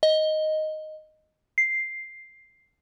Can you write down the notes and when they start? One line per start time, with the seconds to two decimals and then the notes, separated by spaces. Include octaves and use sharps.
0.03 D#5
1.58 C7